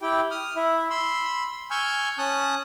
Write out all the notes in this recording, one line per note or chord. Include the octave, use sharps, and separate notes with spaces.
E4 G4 G5
D#6 F6
E4 E5
B5 C6 E6
G#5 C#6 E6 F6 G6
C#4 A5 D#6 F#6